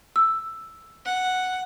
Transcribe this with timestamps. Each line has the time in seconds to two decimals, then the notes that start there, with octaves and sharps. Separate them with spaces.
0.16 E6
1.06 F#5